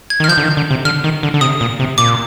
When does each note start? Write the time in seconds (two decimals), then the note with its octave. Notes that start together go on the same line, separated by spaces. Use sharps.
0.10 G#6
0.20 D#3
0.24 F6
0.28 F3 G6
0.38 D3
0.43 D#3
0.57 D3
0.71 C3
0.85 D3 F6
1.04 D#3
1.23 D3
1.34 D3
1.41 C3 D#6
1.61 A#2
1.79 C3
1.98 A#2 D6